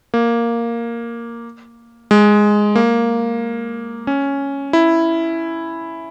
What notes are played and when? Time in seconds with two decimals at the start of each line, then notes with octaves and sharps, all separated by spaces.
0.14 A#3
2.11 G#3
2.76 A#3
4.07 C#4
4.73 E4